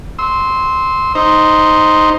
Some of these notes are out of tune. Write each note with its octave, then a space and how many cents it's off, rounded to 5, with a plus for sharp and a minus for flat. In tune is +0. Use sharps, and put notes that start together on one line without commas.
C6 +0 E6 -25
D#4 +0 C5 +0